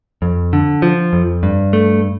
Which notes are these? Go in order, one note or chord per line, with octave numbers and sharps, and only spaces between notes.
F2
D3
F3
F2
G2
A3